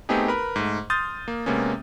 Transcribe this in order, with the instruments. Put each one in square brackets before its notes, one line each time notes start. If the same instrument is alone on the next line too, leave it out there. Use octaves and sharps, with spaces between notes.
[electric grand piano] A3 B3 C4 D#4 G4 G#4
A#4 B4 B5
G#2 A3
C6 D#6 F6 G6 A6
A#3
C3 G#3 A#3 B3 C#4